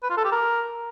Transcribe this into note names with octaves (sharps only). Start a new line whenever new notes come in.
B4
F4
A4
G4
A#4